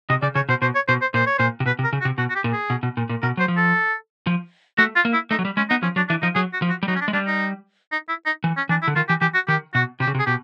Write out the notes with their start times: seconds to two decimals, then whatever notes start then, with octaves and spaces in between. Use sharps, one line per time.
0.10 C3 D#5
0.22 C#3 D5
0.35 C#3 C#5
0.49 B2 C5
0.62 B2 C5
0.75 C#5
0.88 B2 C5
1.02 C5
1.14 A#2 C5
1.27 C#5
1.38 A#2 C5
1.60 C3
1.66 B2 B4
1.79 C3
1.84 A#4
1.93 C#3
2.01 F#4
2.05 C3
2.18 B2 F#4
2.30 F#4
2.36 G4
2.44 A#2
2.53 G#4
2.70 B2
2.83 B2
2.97 A#2
3.09 A#2
3.22 B2 A#4
3.37 F#3 C5
3.48 F3
3.57 A4
4.27 F3
4.78 A3 F#4
4.96 F4
5.05 A#3
5.13 E4
5.31 A3 D#4
5.39 F#3
5.45 G3
5.57 G#3 C#4
5.70 B3 D#4
5.83 F3 C#4
5.96 F#3 D4
6.09 E3 D4
6.22 F3 D#4
6.35 F#3 G#4
6.53 F#4
6.62 F3
6.70 F#4
6.83 G3
6.88 F#3 D#4
6.95 C#4
7.01 D4
7.08 G#3
7.13 G3 D4
7.27 D#4
7.92 D#4
8.09 E4
8.26 D#4
8.44 E3
8.57 C#4
8.69 E3 D4
8.82 E4
8.88 D3
8.96 D#3 F4
9.09 E3 G4
9.21 E3 G4
9.35 F#4
9.48 D#3 G4
9.75 B2 F#4
10.00 C3 G4
10.07 C#3
10.15 C3
10.20 G#4
10.26 B2 G4